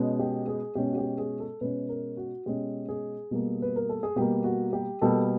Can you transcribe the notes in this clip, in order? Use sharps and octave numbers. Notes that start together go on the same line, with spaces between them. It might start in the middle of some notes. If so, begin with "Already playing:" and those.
Already playing: B2 G#3 C#4
G4
G#4
B2 G#3 C#4 G4
F#4
G4
G#4
A4
B2 G#3 C#4 B4
A#4
F#4
B2 G#3 C#4 G4
G#4
B2 G3 A#3
B4
A#4
A4
G#4
B2 G3 A#3 G4
F#4
G4
B2 G3 A#3 A4